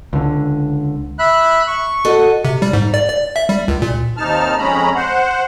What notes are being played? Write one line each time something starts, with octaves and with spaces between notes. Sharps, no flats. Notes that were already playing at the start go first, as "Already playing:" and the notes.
C#2 D3
E5 B5 F#6
C#6
F#4 A4 D#5
C3
G3
G#2
D5
D5
E5
G3
C#2
A#2
D#2 C3 D#4 A5 F6
F2 G#3 C#4 A#5 B5
C5 F#5